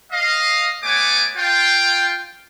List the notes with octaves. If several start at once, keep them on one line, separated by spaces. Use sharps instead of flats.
D#5 F5
A3 B3 C#5 G#5 D6
F4 G5